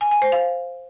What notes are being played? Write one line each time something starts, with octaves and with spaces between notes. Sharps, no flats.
G#5
G#5
C5
F5